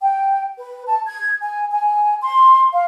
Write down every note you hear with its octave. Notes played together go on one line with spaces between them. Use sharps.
G5
B4
A5
G#6
G#5
G#5
C6
F5